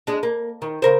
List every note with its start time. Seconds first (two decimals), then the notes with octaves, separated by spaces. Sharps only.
0.07 G#3 D4
0.23 A#3
0.62 D#3
0.82 C#3 A#4 C5